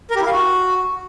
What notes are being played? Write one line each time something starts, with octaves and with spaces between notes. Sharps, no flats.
A#4
G4
E4
F5
F#4